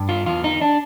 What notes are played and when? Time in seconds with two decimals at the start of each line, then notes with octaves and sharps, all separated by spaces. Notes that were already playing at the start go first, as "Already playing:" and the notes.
Already playing: G2
0.09 F4
0.26 E2 F4
0.44 D#4
0.61 D4